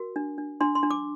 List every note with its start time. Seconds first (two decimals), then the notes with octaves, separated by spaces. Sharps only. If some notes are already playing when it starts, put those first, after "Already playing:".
Already playing: F#4 A#4
0.16 D4
0.38 D4
0.61 D4 C6
0.75 C6
0.83 D4
0.91 D6